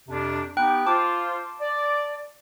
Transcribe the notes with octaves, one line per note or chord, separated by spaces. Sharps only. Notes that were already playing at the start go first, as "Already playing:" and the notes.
F2 C3 D4
B3 D#4 G4 G5 F#6
F4 C5 A5 D6
D5